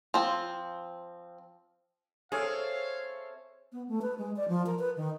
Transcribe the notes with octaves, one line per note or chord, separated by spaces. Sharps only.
F3 C4
C4 G#4 A4 C#5 E5 F5
B3
A3
B4
G#3
D5
F3
A#4
B4
D#3